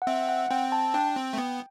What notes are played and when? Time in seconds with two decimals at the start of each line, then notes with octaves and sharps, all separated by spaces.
0.02 F#5
0.07 C4 E5
0.29 F#5
0.51 C4 G5
0.72 A5
0.94 D4 G5
1.16 C4
1.33 A3
1.38 B3